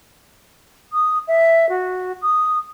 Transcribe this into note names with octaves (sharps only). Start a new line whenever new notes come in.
D#6
E5
F#4
D#6